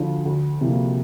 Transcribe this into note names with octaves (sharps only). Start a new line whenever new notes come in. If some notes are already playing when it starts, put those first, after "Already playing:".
Already playing: D2 D3 F3
D2
C3 F3 A#3